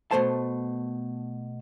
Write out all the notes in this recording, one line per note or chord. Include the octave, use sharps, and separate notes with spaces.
B2 G#3 A3 C5 A5